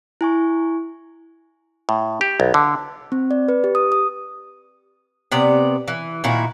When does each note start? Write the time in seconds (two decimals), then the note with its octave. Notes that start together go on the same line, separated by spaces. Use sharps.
0.21 E4 G#5 C#6
1.89 A2
2.21 G4
2.40 B1
2.54 D3
3.12 C4
3.31 D5
3.48 B4
3.64 G4
3.75 D#6
3.92 D#6
5.32 C3 B3 D5
5.88 E3
6.24 A#2 D#3 E4 F#4